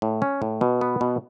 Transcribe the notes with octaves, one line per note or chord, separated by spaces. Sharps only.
A2
C#4
A2
B2
B3
B2